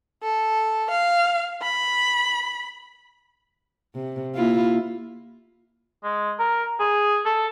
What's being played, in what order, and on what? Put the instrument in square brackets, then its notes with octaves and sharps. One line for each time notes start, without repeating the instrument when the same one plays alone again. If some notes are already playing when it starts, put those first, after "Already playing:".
[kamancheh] A4
F5
B5
[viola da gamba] C3
A#3 E4 F4
[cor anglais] G#3
A#4
G#4
A4